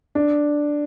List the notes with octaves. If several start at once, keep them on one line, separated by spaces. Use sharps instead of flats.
D4